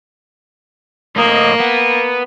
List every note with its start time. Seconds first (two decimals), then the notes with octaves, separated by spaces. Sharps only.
1.16 A2 A#3 D#5
1.60 B3